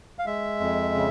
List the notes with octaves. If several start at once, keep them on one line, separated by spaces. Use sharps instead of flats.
F5
G#3 E5
F2
C#3